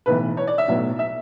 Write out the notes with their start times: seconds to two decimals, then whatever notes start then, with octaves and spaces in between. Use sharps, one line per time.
0.06 B1 A2 E3 B4
0.37 C#5
0.47 D5
0.58 E5
0.68 B1 A2 F#3 B3
0.99 E5